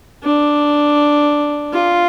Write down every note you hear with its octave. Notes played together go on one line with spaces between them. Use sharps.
D4
F4